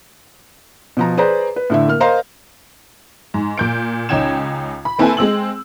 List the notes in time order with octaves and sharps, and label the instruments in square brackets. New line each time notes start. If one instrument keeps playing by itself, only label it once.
[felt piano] B2 F3 A#5
G#4 B4 C5 D5 A#5
B4
A2 D3 E5
A#3 F6
A#4 C5 D#5 F5 A#5 C6
[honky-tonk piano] G#2
A#2 G6 D7
C#2 C#4 D#4 G5 G#6 E7
B5
A#3 C4 E4 A4 B4 G#5
G#3 C4 E6 F#7